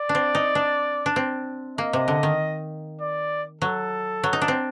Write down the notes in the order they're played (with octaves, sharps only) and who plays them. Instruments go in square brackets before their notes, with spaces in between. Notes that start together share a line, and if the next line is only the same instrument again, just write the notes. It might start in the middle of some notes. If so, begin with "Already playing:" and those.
Already playing: [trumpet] D5
[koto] D4
C4
D#4
D4
D4
C4
[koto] A#3 [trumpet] D#5
[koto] C3
D3
D#3
[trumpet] D5
[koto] F#3 [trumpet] A4
[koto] F#3
D#4
D4
C4